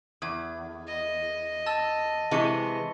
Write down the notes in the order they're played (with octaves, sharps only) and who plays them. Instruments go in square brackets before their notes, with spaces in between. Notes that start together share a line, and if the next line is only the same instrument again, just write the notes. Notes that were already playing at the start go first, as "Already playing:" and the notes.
[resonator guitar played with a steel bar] E2 [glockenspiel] D#6 G#6
[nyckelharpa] D#5
[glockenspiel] A5 E6 A6
[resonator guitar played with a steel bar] C3 E3 G#3 [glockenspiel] C#6 C#7 G7